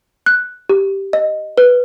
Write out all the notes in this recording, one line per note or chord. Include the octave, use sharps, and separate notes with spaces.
F#6
G4
D#5
B4